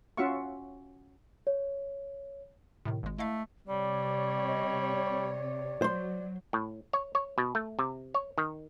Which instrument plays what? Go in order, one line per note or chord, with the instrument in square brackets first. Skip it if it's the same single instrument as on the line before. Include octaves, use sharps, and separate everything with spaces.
[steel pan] C#4 F4 F#4 E5 F5 C#6
[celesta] C#5
[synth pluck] A2 C3 D#3
G#1 G#3
[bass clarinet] A3 [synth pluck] E4 D#5 F5
[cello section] C3 C#5 [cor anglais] G3 [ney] D5
[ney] D#5
D5
[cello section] F#3 [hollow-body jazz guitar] C5 C6
[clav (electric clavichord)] A2
C#5
C#5
B2
A3
C3
C#5
D#3